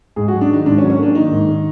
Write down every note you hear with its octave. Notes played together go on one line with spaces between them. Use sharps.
G#2 G#4
F#4
F#3
D4
D#3 D#4
G#2 D4
C#4
F#3
C#4
A#3 D4
D#3 D#4
G#2
D#3